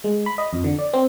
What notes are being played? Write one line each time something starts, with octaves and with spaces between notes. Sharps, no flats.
G#3
B5
D#5
F2
D3
D5
C4